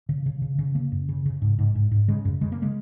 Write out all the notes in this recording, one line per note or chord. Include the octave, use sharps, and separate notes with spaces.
C#3
C#3
C#3
C#3
C#3 A#3
F#2
C#3
C#3
G#2
G#2
G#2
G#2
C#3 G#3
F#2
C#3 G#3
A#3
G#3